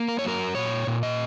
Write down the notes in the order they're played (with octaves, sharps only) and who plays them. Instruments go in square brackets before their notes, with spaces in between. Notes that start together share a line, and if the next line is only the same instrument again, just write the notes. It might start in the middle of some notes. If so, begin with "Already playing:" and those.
Already playing: [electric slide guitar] A#3
A#4
C#5
F#3 A#4
A#2 C#5
A#2
D#5